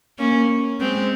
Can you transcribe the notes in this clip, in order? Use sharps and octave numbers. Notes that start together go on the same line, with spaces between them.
A#3 C#4
G#3 C4